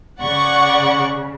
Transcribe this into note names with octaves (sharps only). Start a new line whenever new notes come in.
C#3 D5 F#5 C#6